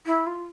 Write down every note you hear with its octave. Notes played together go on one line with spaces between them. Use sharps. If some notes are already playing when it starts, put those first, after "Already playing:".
E4
F4